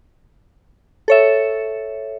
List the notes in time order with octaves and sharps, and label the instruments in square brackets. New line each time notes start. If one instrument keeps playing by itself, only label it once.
[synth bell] A4 C#5 E5